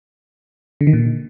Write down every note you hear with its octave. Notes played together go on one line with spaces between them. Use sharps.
D3
D#3
A#2